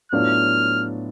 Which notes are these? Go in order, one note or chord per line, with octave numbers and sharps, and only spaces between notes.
A2 F#3 B3 D4 F4 F6